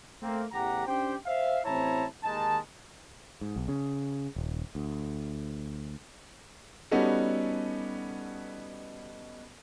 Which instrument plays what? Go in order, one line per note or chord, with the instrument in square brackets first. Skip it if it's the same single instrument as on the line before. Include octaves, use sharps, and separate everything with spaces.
[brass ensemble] A3 A#3 C4
A1 E2 G4 F#5 A#5
C#4 D4 G4 C5 G5
C5 E5 F5
A1 C4 E4 C#5 A5 A#5
D#2 D#3 G#3 D#4 A5
[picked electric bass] G#2
B1
C#3
D#1
D2
[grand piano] G3 B3 C#4 D#4 F#4 A4